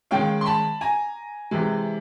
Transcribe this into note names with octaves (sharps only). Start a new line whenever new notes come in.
D#3 G#3 C#4 F5 G5
C6
A5 B5
G#5 A#5
C3 E3 G#3